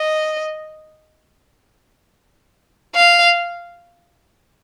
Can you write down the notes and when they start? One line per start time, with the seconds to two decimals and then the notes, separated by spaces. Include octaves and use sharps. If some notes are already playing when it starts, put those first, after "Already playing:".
Already playing: D#5
2.95 F5